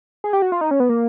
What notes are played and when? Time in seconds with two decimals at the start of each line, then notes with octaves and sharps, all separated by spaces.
0.24 G#4
0.33 G4
0.42 F#4
0.52 F4
0.61 D#4
0.71 C#4
0.80 B3
0.89 A#3